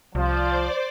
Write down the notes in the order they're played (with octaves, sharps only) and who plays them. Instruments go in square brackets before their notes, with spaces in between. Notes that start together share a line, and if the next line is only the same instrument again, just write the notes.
[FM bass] C2 [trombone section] F3 [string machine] C5 D5 D6